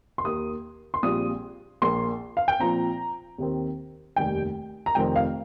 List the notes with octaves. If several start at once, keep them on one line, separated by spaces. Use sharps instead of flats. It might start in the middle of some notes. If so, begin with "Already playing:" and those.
C6
D#2 D#3 A#3 D#6
C6
A#1 A#2 G3 C4 F4 D#6
A#1 A#2 A#3 C6
F5
G5
A#2 F3 C4 A#5
D#2 D#3 C4
F1 D#2 D#3 G3 D#4 G5
A#5
F1 F2 D#3 C4 G5
F5